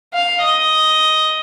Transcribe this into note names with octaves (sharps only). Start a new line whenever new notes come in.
F5
D#5